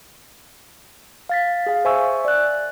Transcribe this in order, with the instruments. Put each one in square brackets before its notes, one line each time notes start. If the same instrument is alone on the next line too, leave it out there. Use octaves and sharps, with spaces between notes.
[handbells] F5 A6 B6
G#4 F5
C5 E5 G#5 C#6 E6
D5 F#6